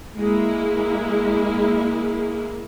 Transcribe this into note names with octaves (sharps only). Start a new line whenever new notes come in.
G#3 A#3 E4